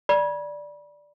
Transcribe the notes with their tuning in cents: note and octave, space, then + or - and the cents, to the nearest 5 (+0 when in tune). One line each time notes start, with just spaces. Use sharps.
D5 +0 B5 -35